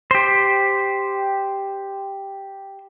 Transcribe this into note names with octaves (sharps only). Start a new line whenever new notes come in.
G4 C5